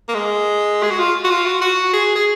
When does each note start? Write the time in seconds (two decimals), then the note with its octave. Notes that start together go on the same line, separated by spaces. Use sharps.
0.09 A#3
0.15 G#3
0.83 G#4
0.91 F#4
0.99 F4
1.24 F#4
1.30 F4
1.46 F#4
1.61 F#4
1.93 G#4
2.16 G#4